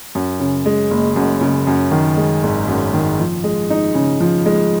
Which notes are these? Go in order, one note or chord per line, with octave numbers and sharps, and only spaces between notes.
F#2
C#3
G#3
F#1
F#2
C#3
F#2
D#3
G#3
G#1
F#2
D#3
F3
G#3
D#4
C#3
F3
G#3